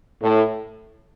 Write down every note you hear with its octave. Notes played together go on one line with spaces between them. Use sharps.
A2